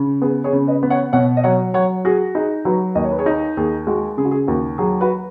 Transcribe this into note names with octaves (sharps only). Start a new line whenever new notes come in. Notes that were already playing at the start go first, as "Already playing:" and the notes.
Already playing: C#3
B3 G#4
G#4 C#5
C#3
B4 D#5
B3
C#5 F#5
B2 C#5 F#5
D#5
F#3 C#5 F#5
F#3 C#5 F#5
F#4 G#4
D#4 G#4
F#3 F#4 B4
D#2 D#5
C#5
B4
G#4 C#5
D#4
D#2 G#4
G#3 F#4
C#3 G#4
F#4
G#4
D#2 F#4
F#3 G#4
F#4 B4